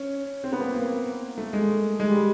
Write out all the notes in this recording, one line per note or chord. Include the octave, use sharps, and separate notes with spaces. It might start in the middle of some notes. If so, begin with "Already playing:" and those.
Already playing: C#4
C4
B3
A#3
A#3
A3
G#3
G#3
G3